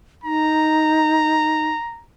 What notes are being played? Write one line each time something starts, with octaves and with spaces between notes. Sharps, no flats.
D#4 A#5